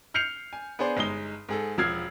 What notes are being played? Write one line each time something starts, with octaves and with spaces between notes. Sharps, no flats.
F6 G6 C7 C#7 F7
G#5
B3 D4 G#4 C5
G1 G#3 D#4 D#6 G7
G#2 G#4 A4
E1 F3 E6 F6 G#6 C7